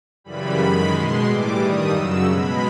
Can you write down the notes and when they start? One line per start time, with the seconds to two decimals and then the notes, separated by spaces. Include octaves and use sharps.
0.24 F#2 C#3 E3 G3 B5
0.58 F#2 D#3 G#3 B5
0.91 B2 G#3 C6
1.24 A2 E3 G3 D6
1.58 G2 D#3 G3 D#6
1.91 F#2 C#3 F#3 E6
2.24 B2 G#3 B5